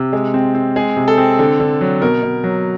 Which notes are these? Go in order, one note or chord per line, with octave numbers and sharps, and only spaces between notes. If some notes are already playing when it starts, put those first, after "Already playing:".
Already playing: C3
G#3
C4
C4
G#3 G#4
C3
A4
C4
D3
D3
F#3
B2 A#4
B2
F#3